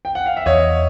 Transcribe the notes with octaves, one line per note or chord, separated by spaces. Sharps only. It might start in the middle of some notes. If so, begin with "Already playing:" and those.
G5
F#5
F5
E5
E2 C#5 D#5